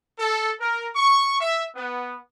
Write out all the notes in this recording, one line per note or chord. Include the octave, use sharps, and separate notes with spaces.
A4
A#4
C#6
E5
B3